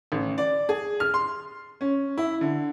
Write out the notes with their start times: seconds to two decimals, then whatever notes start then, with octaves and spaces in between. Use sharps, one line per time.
0.12 A1
0.38 D5
0.69 G#4
1.00 F6
1.14 C6
1.81 C#4
2.18 E4
2.41 D3